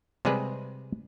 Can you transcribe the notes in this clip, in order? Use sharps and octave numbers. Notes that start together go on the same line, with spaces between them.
C3 G3 G#3 G#4 B4